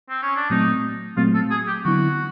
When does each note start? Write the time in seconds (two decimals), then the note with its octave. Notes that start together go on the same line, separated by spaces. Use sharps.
0.09 C4
0.23 C#4
0.36 D4
0.50 A#2 F#3 A3 C4 D#4
1.17 A#2 F#3 A3 C4 F4
1.34 A4
1.50 G#4
1.67 G4
1.85 D3 F#3 B3 E4 F#4